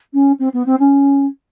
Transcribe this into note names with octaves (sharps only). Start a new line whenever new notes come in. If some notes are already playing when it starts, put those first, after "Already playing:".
C#4
C4
B3
C4
C#4